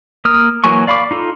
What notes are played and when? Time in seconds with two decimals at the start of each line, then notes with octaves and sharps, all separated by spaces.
0.25 A#3 D#6 F6
0.64 E3 F#3 A#3 G#5 C#6
0.87 D5 F5 B5 C#6 D6
1.11 D#4 F4 A4